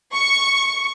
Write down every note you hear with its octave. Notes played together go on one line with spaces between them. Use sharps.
C#6